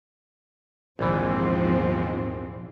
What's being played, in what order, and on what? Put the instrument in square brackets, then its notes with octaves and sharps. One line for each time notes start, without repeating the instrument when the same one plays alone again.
[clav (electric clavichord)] A#1 E3 [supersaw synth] D#2 G#2 [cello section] F3 C4